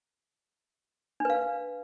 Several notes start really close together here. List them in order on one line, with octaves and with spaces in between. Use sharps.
D4 B4 F5